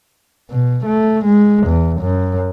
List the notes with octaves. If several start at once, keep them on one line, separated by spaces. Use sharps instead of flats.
B2
A3
G#3
E2
F#2